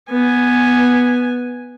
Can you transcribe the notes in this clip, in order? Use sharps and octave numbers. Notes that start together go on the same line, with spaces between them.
B3 G#5